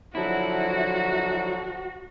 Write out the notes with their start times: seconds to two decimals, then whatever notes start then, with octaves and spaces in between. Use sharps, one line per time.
0.15 D3 F3 F#3 E4 F#4